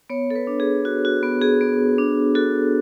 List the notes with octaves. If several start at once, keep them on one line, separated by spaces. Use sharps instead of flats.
B3 C#5
A4
B4
D4
G#4
F#4
F#4
B3
G#4
B3
D4
F#4 A4